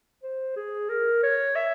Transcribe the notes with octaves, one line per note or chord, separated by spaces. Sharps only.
C5
G#4
A#4
C#5
E5